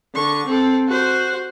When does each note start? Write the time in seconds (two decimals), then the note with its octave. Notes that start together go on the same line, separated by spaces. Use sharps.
0.14 D3 C#6
0.47 C4 A4
0.88 F#4 C5